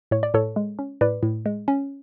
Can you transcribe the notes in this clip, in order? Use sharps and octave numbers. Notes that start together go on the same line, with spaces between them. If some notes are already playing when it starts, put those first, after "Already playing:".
A2 C#5
D5
A2 A4 C#5
G#3
C#4
A2 B4 D5
A2
G#3
C#4